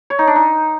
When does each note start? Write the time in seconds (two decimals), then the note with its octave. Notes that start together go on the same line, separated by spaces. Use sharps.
0.10 C#5
0.19 D#4
0.27 D4
0.36 D#4